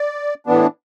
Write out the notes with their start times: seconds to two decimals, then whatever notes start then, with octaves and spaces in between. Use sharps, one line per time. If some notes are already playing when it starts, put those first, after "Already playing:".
Already playing: D5
0.47 A2 E3 B3 D4